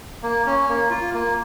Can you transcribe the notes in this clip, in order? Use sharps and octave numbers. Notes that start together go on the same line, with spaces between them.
A#3
C#4
A#3
F4
A#3